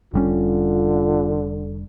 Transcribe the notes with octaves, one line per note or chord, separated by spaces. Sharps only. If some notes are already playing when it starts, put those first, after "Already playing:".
F1 D3 G3 C#4 F4